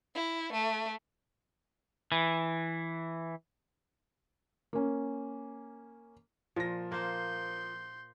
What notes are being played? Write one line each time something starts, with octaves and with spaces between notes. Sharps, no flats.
E4
A3
E3
A#3 C#4
A#2 F3 A#6
A#3 C5 C6 G6